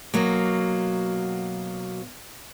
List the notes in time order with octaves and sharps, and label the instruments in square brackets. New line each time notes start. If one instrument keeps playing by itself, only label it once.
[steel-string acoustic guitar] B2 F#3 A#3